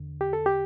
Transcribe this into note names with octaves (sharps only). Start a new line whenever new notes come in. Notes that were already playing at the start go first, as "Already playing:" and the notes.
Already playing: E2 D3
G4
A4
G4